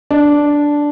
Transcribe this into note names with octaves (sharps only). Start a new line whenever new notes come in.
D4